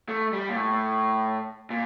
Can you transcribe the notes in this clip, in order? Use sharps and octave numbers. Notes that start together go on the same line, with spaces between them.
A3
G3
A#2
A2
A#2